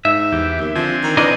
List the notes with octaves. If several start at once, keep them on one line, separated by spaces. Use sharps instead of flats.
G#2 E5
E2 G4
D#2
D3 F3 C4 G#5
D#3
E3 D4 A#4 D#5